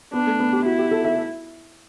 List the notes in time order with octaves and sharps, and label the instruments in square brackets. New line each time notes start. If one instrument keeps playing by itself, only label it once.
[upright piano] B3 [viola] D4
[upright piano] A3
B3
G4
[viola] E4 [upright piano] F#4
[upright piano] G4
A4
E5